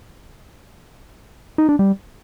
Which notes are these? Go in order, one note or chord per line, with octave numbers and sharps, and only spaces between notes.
D#4
D4
G3